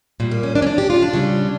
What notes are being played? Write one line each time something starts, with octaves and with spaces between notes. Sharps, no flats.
A#2 G3
A#3
C#4
D4
C#4
D4
G4
F4
D4
C#3 G3